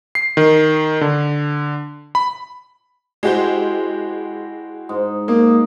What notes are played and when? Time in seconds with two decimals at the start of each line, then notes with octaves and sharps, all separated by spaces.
0.15 C7
0.37 D#3
1.01 D3
2.15 B5
3.23 G#3 E4 F#4 G4 C5
4.89 G#2
5.28 A#3 D#5